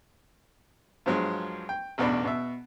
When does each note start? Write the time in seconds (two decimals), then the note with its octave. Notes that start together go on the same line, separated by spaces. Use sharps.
1.06 G2 F3 F#3 G#3
1.69 G5
1.98 A1 E2 B2 D4 B5
2.25 B2 E5